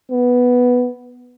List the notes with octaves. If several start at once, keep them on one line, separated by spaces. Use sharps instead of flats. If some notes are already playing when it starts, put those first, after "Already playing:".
B3